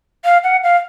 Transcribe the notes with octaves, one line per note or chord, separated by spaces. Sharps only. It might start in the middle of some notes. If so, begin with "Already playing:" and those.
F5
F#5
F5